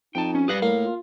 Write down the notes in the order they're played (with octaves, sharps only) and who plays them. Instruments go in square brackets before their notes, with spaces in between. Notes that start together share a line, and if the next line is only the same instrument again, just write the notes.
[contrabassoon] F2 [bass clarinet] D#4 [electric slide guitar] G5 A5
[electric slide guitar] C#4
[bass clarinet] G3 [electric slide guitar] G4 B4 F5 [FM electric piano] D#6 F#6 A#6
[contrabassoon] A2 [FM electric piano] A#3 [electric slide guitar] F5
[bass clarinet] F4